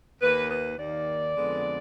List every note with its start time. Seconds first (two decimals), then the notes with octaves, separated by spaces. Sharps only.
0.21 D#2 D#3 A#3 B4
0.49 B4
0.78 D#2 D#3 A#3 D5
1.34 F2 D3 G#3 B3